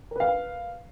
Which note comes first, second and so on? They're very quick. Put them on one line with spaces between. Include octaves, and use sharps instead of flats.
A#4 B4 F5